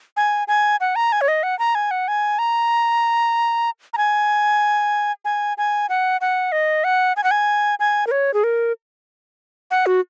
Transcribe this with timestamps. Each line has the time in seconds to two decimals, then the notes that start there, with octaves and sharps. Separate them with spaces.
0.17 G#5
0.48 G#5
0.81 F#5
0.96 A#5
1.12 G#5
1.21 C#5
1.28 D#5
1.43 F#5
1.59 A#5
1.75 G#5
1.91 F#5
2.08 G#5
2.39 A#5
3.93 A#5
3.98 G#5
5.25 G#5
5.58 G#5
5.89 F#5
6.21 F#5
6.52 D#5
6.84 F#5
7.17 G#5
7.24 F#5
7.31 G#5
7.80 G#5
8.07 A#4
8.11 C#5
8.34 G#4
8.44 A#4
9.71 F#5
9.86 F#4